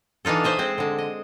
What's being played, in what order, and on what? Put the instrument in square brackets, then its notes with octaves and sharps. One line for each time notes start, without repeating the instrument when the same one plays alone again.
[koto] E3 D4 D#4 F4 A4
C5 D#5 E5 G#5
G#3 C4 C5
D3 G#3
D#5